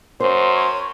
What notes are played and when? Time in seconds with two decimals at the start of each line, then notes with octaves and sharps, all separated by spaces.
0.20 F#2 C5 C6
0.55 C#5